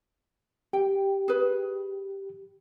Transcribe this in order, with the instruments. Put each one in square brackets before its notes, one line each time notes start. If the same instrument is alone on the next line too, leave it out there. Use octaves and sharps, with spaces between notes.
[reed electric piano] G4 [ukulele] G5
[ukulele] G#4 B4